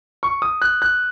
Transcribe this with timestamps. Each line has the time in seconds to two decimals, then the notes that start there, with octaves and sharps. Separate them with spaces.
0.23 C#6
0.42 D#6
0.62 F#6
0.82 F#6